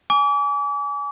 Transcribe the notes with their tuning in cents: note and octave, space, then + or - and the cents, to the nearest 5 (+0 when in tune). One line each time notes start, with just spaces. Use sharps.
G#5 +0 D6 -35